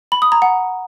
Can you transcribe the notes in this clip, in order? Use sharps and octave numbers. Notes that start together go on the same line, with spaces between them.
B5
D#6
A#5
F#5